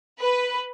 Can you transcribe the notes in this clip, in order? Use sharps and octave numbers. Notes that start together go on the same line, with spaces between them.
B4